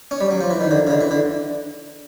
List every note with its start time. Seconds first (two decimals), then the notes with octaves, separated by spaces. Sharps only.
0.11 C#4
0.21 G3
0.31 F#3
0.41 F3
0.51 E3
0.61 D#3
0.71 D3
0.87 C#3
0.91 D3
1.01 E3
1.11 D3